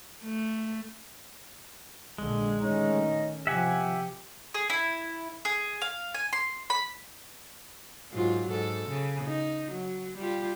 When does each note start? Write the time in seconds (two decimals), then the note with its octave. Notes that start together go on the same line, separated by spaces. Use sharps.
0.23 A3
2.18 A#1 D3 G#3
2.61 D#3 A3 C#4 D#4
3.47 C3 F3 G4 E5 F#5 G#5
4.54 G#4
4.70 E4
5.45 G#4
5.82 F5
6.14 G#5
6.33 C6
6.70 B5
8.13 G#2 F#3 F4
8.49 G#2 A4
8.88 C#3
9.25 D#4
9.71 F#3
10.17 G3 F4 G4